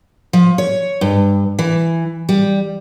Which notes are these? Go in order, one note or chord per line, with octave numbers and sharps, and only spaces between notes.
F3
C#5
G2
E3
G3